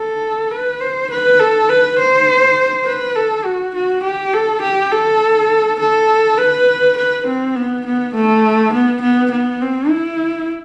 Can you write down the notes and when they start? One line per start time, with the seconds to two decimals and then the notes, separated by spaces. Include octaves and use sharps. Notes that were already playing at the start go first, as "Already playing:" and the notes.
Already playing: A4
0.51 B4
0.81 C5
1.10 B4
1.39 A4
1.69 B4
1.99 C5
2.86 B4
3.16 A4
3.45 F#4
3.75 F#4
4.04 G4
4.34 A4
4.62 G4
4.92 A4
5.80 A4
6.38 B4
6.98 B4
7.27 C4
7.56 B3
7.86 B3
8.15 A3
8.73 B3
9.02 B3
9.31 B3
9.62 C4
9.90 E4